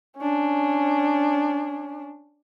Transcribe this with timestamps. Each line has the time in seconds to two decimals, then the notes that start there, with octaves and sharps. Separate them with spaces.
0.17 C#4 D4